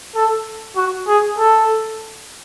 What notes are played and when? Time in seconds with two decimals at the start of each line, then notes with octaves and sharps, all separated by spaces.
0.15 A4
0.77 F#4
1.08 G#4
1.38 A4